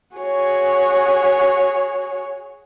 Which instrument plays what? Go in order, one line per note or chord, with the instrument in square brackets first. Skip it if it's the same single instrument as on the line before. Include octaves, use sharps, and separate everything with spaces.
[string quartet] F#4 G#4 C#5